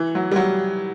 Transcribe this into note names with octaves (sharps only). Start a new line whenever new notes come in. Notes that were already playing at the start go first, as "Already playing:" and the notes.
Already playing: E3
F#3
G3
F#3